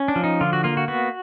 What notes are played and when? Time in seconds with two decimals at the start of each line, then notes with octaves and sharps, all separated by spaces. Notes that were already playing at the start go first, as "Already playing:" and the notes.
Already playing: C#4
0.08 D4
0.16 F3
0.24 D#4
0.41 D3 F4
0.53 F#4
0.64 A#3 F4
0.77 F#4
0.88 B3 F#4